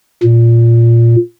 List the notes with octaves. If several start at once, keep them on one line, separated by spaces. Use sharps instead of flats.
A#2